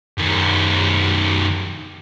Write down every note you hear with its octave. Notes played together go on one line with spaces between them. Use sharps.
F#2 D#3